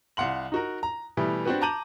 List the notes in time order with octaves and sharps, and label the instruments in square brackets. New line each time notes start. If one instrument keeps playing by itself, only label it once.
[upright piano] C2 F5 F#5 C6 F#7
D#4 F#4 A#4
A#5
B2 E3 G3 A3
C4 D4 F#4 G4 B4
A5 A#5 D6 G6 D#7 F#7